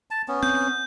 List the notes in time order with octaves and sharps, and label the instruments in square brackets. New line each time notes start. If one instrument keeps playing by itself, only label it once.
[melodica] A5
B3 C#4
[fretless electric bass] C4 [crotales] G6